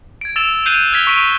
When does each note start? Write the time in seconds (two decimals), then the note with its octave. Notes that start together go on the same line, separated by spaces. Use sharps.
0.21 G#6 D7
0.36 E6 A6 D7 E7 F7
0.66 F#6 G6 C7 D7 D#7 F7
0.93 F6 G#6 B6 G7
1.07 C#6 B6 D7 D#7 F7